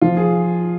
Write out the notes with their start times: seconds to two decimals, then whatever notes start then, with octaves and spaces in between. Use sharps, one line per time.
0.01 F3 F4
0.17 G#4